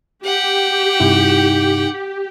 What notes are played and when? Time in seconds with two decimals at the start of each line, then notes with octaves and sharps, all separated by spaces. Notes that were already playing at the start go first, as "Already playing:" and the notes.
0.24 G4 F#5 G5
1.00 G2 C3 D#4 E4